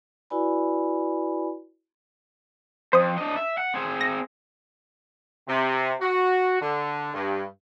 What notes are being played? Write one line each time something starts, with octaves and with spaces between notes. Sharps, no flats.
E4 F#4 B4 D5 G#5 B5
F2 C5 D#6
D4 D#5
E5
F#5
C4 G#4
A#6
C3
F#4
D3
G2